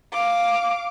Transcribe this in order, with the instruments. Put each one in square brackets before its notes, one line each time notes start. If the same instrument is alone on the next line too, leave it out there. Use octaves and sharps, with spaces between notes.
[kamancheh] F5 D6